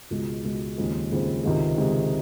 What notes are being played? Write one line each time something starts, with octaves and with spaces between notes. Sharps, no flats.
C#2 B2 G#3
C#2 B2 G#3
D#2 C#3 F3 G#3 C4
D#2 C#3 F3 G#3 C4
C#2 C3 D#3 G#3
C#2 C3 D#3 G#3